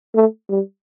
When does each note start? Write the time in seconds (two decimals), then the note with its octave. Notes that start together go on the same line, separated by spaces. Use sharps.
0.15 A3
0.49 G3